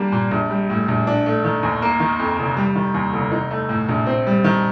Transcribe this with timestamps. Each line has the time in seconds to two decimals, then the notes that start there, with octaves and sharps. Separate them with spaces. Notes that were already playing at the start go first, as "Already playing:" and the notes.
Already playing: G3 A#3 D4
0.12 A#2
0.31 A#1
0.50 G3
0.70 A2
0.88 A#1
1.07 D4
1.26 A3
1.44 D#3
1.63 D#2
1.82 A#3
2.00 D#3
2.19 F2
2.39 F1
2.57 G3
2.75 D#3
2.94 D#2
3.13 F1
3.31 D#4
3.51 A3
3.69 A2
3.89 A#1
4.07 C4
4.27 G3
4.44 D#3